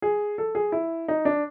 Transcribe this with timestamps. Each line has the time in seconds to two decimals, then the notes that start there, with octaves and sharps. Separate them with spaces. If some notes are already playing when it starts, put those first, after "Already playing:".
0.02 G#4
0.38 A4
0.55 G#4
0.72 E4
1.08 D#4
1.25 D4